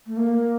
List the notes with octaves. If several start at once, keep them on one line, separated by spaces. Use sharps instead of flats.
A3
A#3